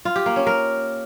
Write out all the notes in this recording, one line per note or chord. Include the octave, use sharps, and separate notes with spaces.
F4
G4
A#3
C#4
A#4